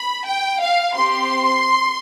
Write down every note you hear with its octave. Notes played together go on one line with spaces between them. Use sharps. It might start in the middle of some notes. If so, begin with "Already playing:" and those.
Already playing: B5
G5
F5
C4 G4 C6